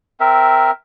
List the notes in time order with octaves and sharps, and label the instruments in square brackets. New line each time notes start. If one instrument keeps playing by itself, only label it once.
[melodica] C4 A#4 E5